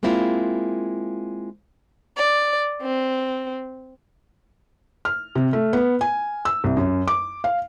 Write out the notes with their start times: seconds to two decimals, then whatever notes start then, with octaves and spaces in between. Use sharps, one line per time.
0.03 G#3 A#3 C4 E4 F4
2.17 D5
2.82 C4
5.05 F6
5.35 C3
5.53 A3
5.73 B3
6.01 G#5
6.45 E6
6.64 C2
6.77 F#2
7.08 D6
7.44 F5